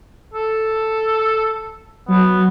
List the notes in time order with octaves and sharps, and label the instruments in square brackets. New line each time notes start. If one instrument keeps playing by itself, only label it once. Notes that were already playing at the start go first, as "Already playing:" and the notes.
[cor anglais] A4
[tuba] F#3 [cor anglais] B3